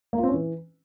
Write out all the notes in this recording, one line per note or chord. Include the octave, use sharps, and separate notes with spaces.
A#3
F4
C4
C#4
E3